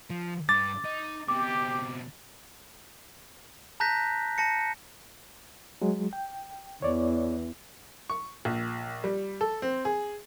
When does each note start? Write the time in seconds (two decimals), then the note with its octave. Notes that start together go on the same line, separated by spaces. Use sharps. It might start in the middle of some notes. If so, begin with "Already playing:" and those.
0.10 F3
0.49 G2 D6 A6
0.85 D#4
1.28 B2 C4 G4 D6
3.80 A5 A#5 F#6 G6 A#6 B6
4.38 A5 A#6 C#7
5.82 F#3 G#3
6.13 G5
6.82 E2 C#5 D5
8.10 C#6
8.45 A#1
9.04 G3
9.41 A4
9.62 C4
9.85 G#4